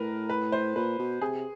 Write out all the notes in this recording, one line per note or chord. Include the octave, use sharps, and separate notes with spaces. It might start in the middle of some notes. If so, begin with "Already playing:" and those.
Already playing: A2 A#4 B4
B4
C5
A#2 B4
B2
C3 G#4